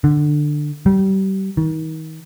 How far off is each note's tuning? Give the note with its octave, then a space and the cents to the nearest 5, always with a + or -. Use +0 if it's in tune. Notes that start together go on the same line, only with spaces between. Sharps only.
D3 +15
G3 -30
D#3 +35